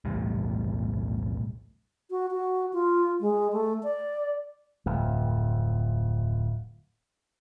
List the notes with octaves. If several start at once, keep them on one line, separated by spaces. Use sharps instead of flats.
B1 E2 A2 G3
F#4
F#4
F4
G#3
A3
D5
D1 F2